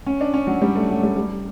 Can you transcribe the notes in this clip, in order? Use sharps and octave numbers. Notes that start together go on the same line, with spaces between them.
C#4
D4
C#4
F#3
G3
A3
F#3
G3
G3